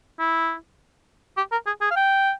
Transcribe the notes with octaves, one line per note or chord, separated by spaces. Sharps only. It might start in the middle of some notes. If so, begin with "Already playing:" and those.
E4
G4
A#4
G#4
G#4
F5
G5